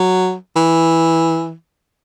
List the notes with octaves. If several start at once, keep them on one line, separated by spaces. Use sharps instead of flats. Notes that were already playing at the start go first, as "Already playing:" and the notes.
Already playing: F#3
E3